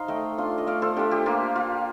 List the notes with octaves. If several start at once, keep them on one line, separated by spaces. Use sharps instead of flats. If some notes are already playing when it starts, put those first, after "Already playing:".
Already playing: D#4 C5 F5
A3 D#5 G5
D4 F4
D#5
A3 D5 F5
A4 C5
D4 F4 G4
G4
A#3 F4
F4